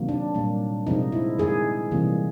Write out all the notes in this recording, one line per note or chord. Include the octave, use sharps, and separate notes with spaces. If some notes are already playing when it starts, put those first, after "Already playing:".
Already playing: C3 D#3 F#3 A#3
D4
A#2 G3 A#3
C3 F3 G#3 D#4
E4
D#3 G#3 G#4
C3 E3 G3 A#3